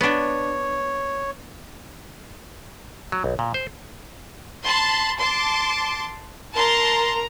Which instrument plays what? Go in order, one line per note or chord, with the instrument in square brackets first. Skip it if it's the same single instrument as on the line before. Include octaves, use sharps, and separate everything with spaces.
[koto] B3 D4 [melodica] C#5
[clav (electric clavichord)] F#3
B1
A#2
C5
[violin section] A5 B5 C6
A5 C6 D6
[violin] A#4 A#5 [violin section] A5 C6